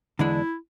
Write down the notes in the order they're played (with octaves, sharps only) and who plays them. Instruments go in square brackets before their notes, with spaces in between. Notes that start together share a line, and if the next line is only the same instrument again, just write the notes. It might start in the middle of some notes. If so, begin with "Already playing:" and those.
[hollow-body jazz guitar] E2 D3 G#3 D4 [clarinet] E4